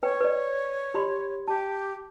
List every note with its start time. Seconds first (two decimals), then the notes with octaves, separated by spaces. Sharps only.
0.03 B4 C#5 G5
0.20 B4 D5
0.94 G4 B5 C6
1.48 G4 A5